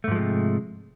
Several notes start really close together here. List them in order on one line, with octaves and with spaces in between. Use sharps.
A3 G#2 F3 G#3 C3